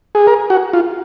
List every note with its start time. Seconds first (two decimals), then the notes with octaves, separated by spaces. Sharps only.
0.15 G#4
0.27 A#4
0.50 F#4
0.73 F4